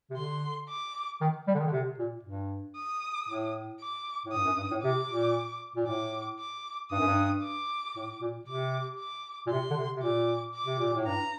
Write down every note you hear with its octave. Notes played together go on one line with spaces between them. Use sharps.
C3
D3 C6
D6
D#3
G3
D3
D#3
D3
C3
A#2
G2
D#6
A2
D6
A2
G2 D#6
F#2
G2
A2
C3 D6
A#2
A#2
A2 D6
D6
G2 D#6
F#2
G2
D6
A2
A#2
C3 D6
D6
A#2
C3 C6
D3
C3
C3
A#2 D6
D6
C3
A#2
A2
G2 A#5